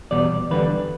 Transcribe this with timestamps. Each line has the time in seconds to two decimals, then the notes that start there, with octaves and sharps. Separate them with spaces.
0.11 E2 B2 G3 B3 D5
0.51 E2 D3 G3 B3 B4